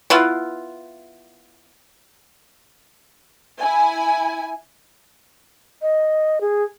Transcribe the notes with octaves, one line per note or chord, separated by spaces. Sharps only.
B3 E4 F4
E4 G#5
D#5
G#4